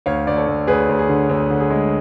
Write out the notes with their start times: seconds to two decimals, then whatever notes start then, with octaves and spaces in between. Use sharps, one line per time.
0.06 D2 C#5 F5
0.27 D2 D5
0.37 A4 C#5
0.47 D2
0.67 D2 G#4 B4
0.89 D2
0.99 G#4
1.09 D3
1.29 D2
1.50 D3
1.60 G#4
1.71 G#3